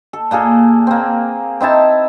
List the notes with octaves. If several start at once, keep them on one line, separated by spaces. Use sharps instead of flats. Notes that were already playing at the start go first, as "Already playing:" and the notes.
A4
A#2 A#3 G#4 A4
A#3 C4
C4 D#4 E4 A5